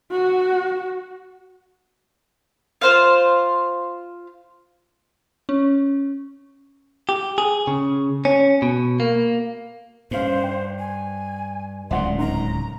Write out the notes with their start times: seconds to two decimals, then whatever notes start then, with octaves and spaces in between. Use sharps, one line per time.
0.11 F#4
2.81 F4 C5 F5
5.49 C#4
7.09 G4
7.38 G#4
7.67 C#3
8.25 C#4
8.62 B2
9.00 A#3
10.11 G2 C#4 C5 F5
10.44 G5
10.79 G#5
11.91 D1 C#2 A2 D5 F#5 C6
12.18 G#1 A#5